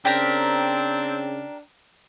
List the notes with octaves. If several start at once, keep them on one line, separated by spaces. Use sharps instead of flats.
C#3 C4 D4 G4 A#4